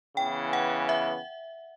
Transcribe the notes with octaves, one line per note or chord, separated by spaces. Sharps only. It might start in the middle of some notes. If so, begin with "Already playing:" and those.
C#3 E3 B3 G5
F#5
E5